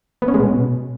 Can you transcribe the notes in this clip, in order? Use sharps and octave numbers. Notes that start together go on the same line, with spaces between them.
B3
C#4
G#3
B2